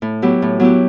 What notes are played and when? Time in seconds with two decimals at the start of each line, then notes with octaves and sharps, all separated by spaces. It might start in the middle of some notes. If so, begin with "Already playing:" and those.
0.02 A2
0.22 F#3 B3 E4 G4
0.42 A2
0.60 F#3 B3 E4 G4